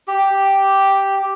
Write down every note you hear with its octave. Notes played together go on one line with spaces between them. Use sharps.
G4